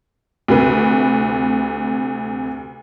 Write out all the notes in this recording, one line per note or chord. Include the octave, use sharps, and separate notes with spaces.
D2 C3 B4